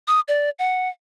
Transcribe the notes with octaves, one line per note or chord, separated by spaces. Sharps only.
D#6
D5
F#5